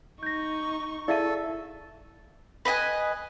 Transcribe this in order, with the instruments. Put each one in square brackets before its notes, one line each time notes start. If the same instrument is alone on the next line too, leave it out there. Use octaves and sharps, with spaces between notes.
[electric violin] D#4 C#6 [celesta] G6 A#6
[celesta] E4 G#4 D#7 [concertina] A4 [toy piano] D5 E5 F5
[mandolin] B4 D#5 G5 G#5